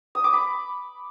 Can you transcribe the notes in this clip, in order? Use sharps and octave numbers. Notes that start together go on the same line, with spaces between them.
D#6
D6
B5